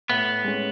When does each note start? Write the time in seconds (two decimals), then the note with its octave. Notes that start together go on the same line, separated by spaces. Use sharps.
0.10 A2 B3
0.44 G#3 C#4